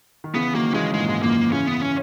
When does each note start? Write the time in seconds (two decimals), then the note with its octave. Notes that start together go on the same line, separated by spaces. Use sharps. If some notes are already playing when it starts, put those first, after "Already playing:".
0.24 D#3
0.34 C#3 E3 B3
0.54 D#3 F#3 A#3
0.73 C#3 E3 G#3
0.94 G#2 G#3
1.00 A#2
1.08 G#2
1.22 F#2 A#2 A#3
1.52 C#3 E3 C#4
1.67 B3
1.82 C#4